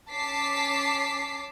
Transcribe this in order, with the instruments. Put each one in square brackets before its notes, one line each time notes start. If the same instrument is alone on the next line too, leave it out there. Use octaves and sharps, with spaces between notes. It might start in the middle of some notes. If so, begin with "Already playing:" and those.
[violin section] C#4 A5 D6 B6 C7